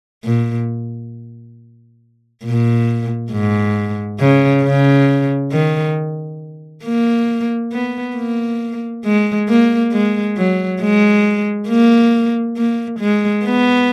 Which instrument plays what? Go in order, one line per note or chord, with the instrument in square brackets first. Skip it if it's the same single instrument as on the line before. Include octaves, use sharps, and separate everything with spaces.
[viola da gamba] A#2
A#2
G#2
C#3
C#3
D#3
A#3
B3
A#3
G#3
A#3
G#3
F#3
G#3
A#3
A#3
G#3
B3